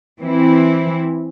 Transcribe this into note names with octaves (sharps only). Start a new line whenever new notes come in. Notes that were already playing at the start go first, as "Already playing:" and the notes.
E3 C4 E4